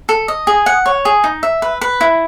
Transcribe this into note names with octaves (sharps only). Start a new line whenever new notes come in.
A4
D#5
G#4
F#5
C#5
G#4
D#4
E5
B4
B4
E4